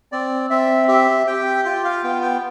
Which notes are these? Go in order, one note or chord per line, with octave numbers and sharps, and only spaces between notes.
C4 D5
C4 E5
G4 E5
G4 G5
F4 G5
F5
B3 G5
G5